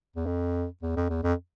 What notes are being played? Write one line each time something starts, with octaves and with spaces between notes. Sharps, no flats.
E2
F2
E2
F2
E2
F2